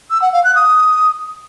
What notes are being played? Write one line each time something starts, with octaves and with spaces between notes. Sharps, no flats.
E6
F#5
F5
F#6
D#6